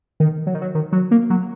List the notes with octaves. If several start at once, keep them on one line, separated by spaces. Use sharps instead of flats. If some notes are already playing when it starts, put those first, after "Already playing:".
D#3
F#3
D#3
F#3
D#3
F#3
A#3
F#3